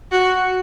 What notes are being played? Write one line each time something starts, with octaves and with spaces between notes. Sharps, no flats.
F#4